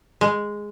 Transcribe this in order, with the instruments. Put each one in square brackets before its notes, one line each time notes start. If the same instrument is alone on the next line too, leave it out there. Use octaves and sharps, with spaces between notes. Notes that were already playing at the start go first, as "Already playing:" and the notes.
[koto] G#3